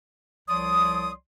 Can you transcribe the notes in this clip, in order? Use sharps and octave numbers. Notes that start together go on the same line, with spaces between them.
C2 F3 C#5 D5 C6 D#6